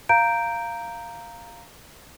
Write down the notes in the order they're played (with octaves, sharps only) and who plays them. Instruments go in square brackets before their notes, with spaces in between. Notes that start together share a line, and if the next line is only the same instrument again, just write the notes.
[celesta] F5 A#5 G6 D7